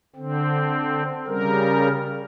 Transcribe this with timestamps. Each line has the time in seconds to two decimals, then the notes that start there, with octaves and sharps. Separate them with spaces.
0.16 D3 C4
1.27 C#3 G3 A#4